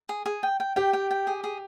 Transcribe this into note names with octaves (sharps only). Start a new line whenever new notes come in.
G#4
G#4
G5
G5
G4 G5
G5
G5
G#4
G#4